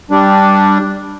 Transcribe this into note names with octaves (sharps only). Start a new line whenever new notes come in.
G3 D4